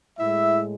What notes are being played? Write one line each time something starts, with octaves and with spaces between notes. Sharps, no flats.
A2 G#3 E4 E5